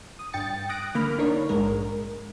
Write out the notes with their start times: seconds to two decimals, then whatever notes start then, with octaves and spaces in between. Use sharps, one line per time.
0.19 D#6
0.33 G2 G5 A6 C#7
0.69 D#6 F#6 A#6 D7
0.95 D3 A#3 B5 F6
1.18 D4 D#4 A#4 C#5
1.49 A#1 G#2 G#3 A#4